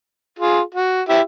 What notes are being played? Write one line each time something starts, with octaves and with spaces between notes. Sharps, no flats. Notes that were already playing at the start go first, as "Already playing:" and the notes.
F4 G#4
F#4
E4 G4 E5